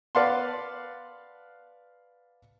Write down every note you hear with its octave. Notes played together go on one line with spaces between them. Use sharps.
B4 D5 F5 F#5 A5 C6